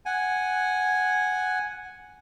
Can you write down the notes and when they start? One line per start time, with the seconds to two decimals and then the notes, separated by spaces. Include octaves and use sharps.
0.06 F#5 G#5